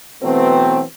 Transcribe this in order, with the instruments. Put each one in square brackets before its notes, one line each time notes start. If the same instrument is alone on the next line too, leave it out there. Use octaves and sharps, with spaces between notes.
[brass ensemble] B2 E3 F#3 A3 B3 C4